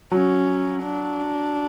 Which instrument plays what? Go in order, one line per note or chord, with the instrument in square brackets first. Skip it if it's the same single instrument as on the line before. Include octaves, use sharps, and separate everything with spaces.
[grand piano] F#3 [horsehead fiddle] C#4
[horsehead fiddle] D4